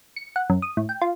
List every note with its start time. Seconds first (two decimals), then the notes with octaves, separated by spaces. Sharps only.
0.16 C#7
0.36 F#5
0.50 F#2
0.62 D#6
0.77 A2
0.89 G5
1.02 F4